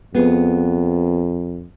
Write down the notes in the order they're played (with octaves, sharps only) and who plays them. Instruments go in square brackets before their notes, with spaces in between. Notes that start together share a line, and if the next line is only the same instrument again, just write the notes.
[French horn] F2 [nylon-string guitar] B3 G#4